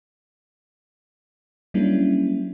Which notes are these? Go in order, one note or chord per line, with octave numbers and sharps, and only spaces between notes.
F#3 G3 A#3 C#4 D4 E4